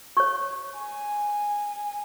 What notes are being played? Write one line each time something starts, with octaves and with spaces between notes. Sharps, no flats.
C#5 C#6
G#5